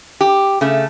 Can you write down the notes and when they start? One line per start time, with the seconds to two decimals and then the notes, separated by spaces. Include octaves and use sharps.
0.21 G4
0.61 C#3 A3